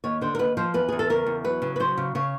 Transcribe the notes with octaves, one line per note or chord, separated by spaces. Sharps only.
D#2 C#5
D3 C5
A#4
D#2 B4
F3 C5
E2 B4
E2 G#4
A4
C#3 A#4
E2
F#3 B4
C#3
B4
F#3 C5
C#3
C#3 C#5